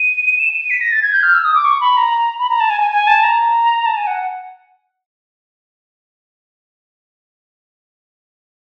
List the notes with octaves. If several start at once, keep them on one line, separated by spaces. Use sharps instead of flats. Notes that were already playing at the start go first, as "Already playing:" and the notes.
Already playing: D#7
E7
D#7
D#7
B6
A#6
A6
G#6
G6
F6
E6
D#6
D6
C#6
B5
A#5
B5
A#5
A5
G#5
G#5
G#5
A5
A#5
A5
G#5
F#5